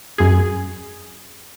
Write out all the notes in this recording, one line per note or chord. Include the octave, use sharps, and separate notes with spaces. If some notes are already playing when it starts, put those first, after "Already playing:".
F#2 G#4